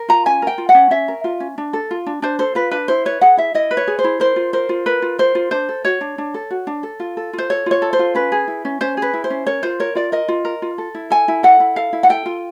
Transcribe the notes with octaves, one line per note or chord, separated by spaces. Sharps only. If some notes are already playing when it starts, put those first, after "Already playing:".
Already playing: A#4
F4 A#5
C#4 G#5
A#4 G5
F4
F#5
C#4
C#4 E5
A#4
F4
C#4
D4
A4
F4
D4
D4 C5
A4 C5
F4 B4
D4 B4
E4 C5
B4 C#5
G#4 F#5
E4 E5
E4 D#5
B4
C#5
G#4
C5
E4
A#4 C5
F4
A#4 C5
F4
A#4 B4
F4
A#4 C5
F4
D4 C5
A4
F#4 C#5
D4
D4
A4
F#4
D4
A4
F4
A4
F4
C5
A4 C#5
F4 C#5
A4
C5
F4
C#4 B4
G#4
E4
C#4
C#4 C5
G#4 B4
E4
C5
C#4
A#4 C#5
F4 C5
A#4 C#5
F4 D5
A#4 D#5
F4
A#4
F4
A4
E4
A4 G#5
E4
A4 F#5
E4
A4 F5
E4
F#5
A4 G5
F4